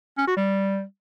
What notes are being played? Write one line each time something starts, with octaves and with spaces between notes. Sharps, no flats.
C#4
F#4
G3